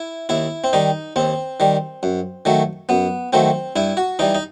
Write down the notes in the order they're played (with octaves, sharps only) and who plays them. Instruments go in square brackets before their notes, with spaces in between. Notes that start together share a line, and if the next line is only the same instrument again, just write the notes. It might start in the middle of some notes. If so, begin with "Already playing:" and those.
Already playing: [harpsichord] E4
D#2 E4
C4
D#3 G3 D#4
D#2 C4
D#3 G3
F#2
D#3 F#3 A3
F#2 B3
D#3 F#3 A3 C4
G2 E4
F#4
E3 G3 D#4
D#4